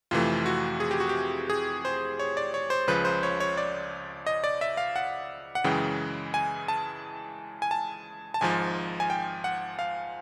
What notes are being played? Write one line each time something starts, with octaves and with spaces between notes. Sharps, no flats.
F2 C3 E3 A3 F4
F#4
G#4
G4
F#4
G4
G#4
C5
C#5
D5
C#5
C5
C#2 C#3 F3 B4
C5
C#5
C#5
D5
D#5
D5
E5
F5
F#5
F#5
F#2 C#3 E3 G#3 G5
G#5
A5
G#5
A5
A5
G#1 G#2 F3 G#5
G#5
G5
F#5
F5